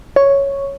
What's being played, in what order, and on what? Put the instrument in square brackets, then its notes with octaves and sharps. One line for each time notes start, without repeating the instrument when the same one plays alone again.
[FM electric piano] C#5